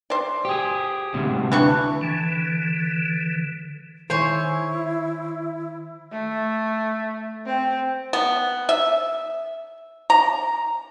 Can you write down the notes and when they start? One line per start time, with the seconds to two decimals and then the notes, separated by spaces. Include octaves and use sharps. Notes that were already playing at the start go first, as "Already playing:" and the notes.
0.10 C5 D5
0.45 G4 G#4
1.14 D2 C3
1.52 E3 D4 C#6
2.01 D3 E3
4.10 D#3 E4 C5 C#5 G#5 C#6
6.12 A3
7.46 C4
8.13 B3
8.69 E5
10.10 A#5